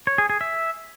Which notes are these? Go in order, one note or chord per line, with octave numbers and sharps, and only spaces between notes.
C#5
G#4
G#4
E5